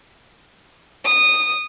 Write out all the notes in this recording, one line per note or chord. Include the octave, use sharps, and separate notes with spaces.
D#6